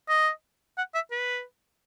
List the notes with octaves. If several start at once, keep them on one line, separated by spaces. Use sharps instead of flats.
D#5
F#5
E5
B4